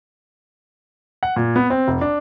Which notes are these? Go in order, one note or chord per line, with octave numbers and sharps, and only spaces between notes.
F#5
A#2
B3
C4
F1
D4